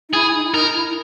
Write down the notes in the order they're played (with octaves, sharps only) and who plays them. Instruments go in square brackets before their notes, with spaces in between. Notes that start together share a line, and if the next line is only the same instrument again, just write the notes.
[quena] D#4
[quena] E4 [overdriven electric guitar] G#4
[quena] D#4
E4
[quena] D#4 [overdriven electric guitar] A#4
[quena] E4